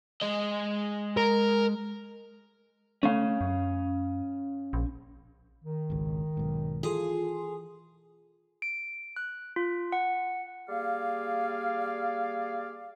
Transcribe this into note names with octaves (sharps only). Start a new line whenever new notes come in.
G#3 D#5
A#4
A3 C#4 F5
F#2
A#1
D#3
G#1 C#2
B1 G#2
E3 F4 G#4 A4 C6
D7
F#6
F4
F#5
G3 A#3 G#4 D5 F5